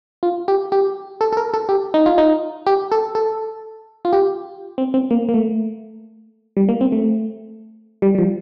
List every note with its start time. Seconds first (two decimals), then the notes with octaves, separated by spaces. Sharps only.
0.23 F4
0.48 G4
0.72 G4
1.21 A4
1.33 A4
1.37 A#4
1.54 A4
1.69 G4
1.94 D#4
2.06 F4
2.18 D#4
2.66 G4
2.92 A4
3.15 A4
4.05 F4
4.13 G4
4.78 C4
4.94 C4
5.11 A#3
5.29 A#3
5.34 A3
6.57 G3
6.69 A#3
6.81 C4
6.92 A3
8.02 G3
8.15 G3
8.18 F3